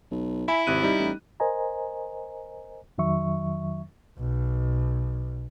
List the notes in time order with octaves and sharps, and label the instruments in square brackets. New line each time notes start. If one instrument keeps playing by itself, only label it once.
[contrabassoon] B1
[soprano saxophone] E4 [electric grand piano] E5 G#5 B5
[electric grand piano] G#1 F#6 D#7 [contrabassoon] C3
[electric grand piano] G3 D#4
[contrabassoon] A1
[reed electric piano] A#4 C5 D#5 G#5 A#5
F2 D#3 F#3 E5 C#6
[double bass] B1